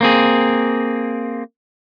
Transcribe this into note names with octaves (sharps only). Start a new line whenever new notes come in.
A#3 C4 G#4